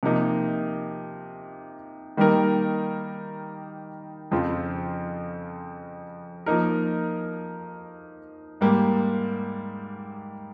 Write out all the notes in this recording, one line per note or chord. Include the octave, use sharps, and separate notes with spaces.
C3 F3 A#3 D#4
D#3 G3 A#3 D#4 A#4
F2 C#3 F3 C4 F4
F3 A#3 D#4 A#4
G#2 G3 A#3